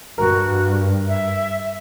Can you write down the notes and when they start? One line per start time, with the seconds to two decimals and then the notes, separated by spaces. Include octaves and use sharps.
0.18 G2 F#4 A#4
1.09 E5